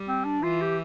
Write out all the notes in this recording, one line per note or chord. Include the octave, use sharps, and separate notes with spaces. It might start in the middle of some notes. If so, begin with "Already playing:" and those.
Already playing: G3
C4
D4
E3 F4
G4